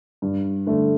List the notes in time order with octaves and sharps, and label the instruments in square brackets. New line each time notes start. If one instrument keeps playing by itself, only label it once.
[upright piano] G2
D3 A3